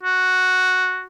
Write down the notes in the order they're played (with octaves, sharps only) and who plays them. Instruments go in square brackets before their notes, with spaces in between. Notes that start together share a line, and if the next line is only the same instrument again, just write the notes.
[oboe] F#4